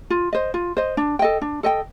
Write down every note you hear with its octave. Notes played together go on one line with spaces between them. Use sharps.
F4
C5 D#5
F4
C5 D#5
D4
A4 D#5 G5
D4
A4 D#5 G5